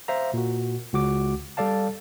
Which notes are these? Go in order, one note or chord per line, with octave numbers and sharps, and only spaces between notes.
C5 E5 F5 A#5
A#2 F#4
C#2 F#4 D6
G3 A4 D5 F5 A5